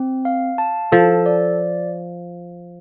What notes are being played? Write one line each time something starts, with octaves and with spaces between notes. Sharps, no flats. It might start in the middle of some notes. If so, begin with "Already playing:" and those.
Already playing: C4
F5
A5
F3 A4
D5